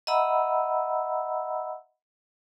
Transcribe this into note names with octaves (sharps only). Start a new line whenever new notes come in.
D#5 E5 F#5 A#5 B5 E6